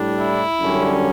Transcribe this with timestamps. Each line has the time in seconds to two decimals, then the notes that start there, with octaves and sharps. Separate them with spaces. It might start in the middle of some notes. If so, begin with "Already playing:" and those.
Already playing: A2 G3 D4
0.18 E4
0.59 F#2 D3 G3 C#4